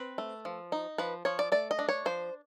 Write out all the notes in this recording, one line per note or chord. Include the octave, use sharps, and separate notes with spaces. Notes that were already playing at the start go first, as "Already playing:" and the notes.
Already playing: C4 B4
A3
F3
D#4
F3 B4
F3 C#5
D5
A3 D5
D#5
D4
C#5
F3 C5